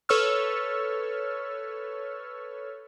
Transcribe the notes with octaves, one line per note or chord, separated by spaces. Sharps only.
A4 B4 C#5 C#6 E6 F6